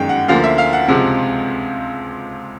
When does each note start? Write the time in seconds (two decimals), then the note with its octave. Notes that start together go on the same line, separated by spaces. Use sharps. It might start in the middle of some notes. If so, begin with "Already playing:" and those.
Already playing: G1 F#2 D#3 G#3 G5
0.09 F#5
0.28 D2 D3 F3 A#3 F5
0.44 E5
0.58 F5
0.73 F#5
0.88 C#2 C3 F3 G#3